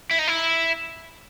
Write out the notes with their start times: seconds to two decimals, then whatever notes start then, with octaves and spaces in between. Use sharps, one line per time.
0.11 E4
0.19 D#4
0.27 E4